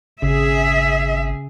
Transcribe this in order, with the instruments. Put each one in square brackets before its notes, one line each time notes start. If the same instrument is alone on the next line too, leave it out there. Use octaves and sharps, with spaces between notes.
[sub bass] G#1 [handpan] C#3 [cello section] G#4 [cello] E5